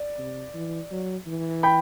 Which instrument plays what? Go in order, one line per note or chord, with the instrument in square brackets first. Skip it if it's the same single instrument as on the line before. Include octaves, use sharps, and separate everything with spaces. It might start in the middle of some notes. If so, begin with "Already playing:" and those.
Already playing: [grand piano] D5
[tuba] C3
E3
F#3
E3
[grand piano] G5 B5